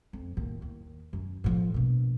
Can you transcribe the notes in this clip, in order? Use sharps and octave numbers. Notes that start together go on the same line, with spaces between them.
F2
D#2 A2
D#2
F#2
A2 F3
A#1 B2